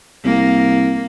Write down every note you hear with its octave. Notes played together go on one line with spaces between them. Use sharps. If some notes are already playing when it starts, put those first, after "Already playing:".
C2 A#3